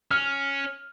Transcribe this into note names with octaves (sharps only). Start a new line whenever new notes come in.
C#4 F6